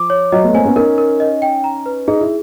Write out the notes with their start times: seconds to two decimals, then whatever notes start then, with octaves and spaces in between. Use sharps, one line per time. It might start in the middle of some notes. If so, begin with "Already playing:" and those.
Already playing: F3 D6
0.10 C#5
0.32 F#3 D#5
0.43 A3 B3
0.54 A#3 C4 G#5
0.65 B3 C#4
0.76 C#4 D#4 A#4
0.98 A#4
1.20 D#5
1.42 G5
1.64 A#5
1.86 B4
2.08 D#4 G#4
2.21 E4